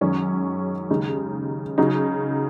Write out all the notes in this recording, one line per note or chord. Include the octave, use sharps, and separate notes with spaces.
F#2 D#3 G#3 C#4
D#2 C#3 G#3 D#4
C#3 F#3 D#4